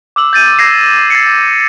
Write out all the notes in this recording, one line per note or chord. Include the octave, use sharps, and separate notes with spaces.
D6 E6 F#7
G6 A6 D#7
G6 G#6 A#6 C7 E7
A6 C7 C#7